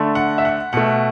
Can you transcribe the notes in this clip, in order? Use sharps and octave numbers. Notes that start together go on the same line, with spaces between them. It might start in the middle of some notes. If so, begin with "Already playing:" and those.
Already playing: D3 A3
F#5
E5
F#5
B2 A3 F#5